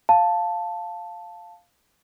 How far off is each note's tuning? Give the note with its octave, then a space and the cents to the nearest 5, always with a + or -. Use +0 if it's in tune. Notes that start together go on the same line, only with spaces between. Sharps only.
F5 +0 A5 +0